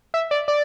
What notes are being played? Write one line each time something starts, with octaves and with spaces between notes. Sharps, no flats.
E5
D5
D5